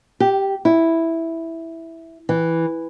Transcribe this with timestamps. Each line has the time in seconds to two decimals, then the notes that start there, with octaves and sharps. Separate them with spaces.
0.20 G4
0.65 E4
2.29 E3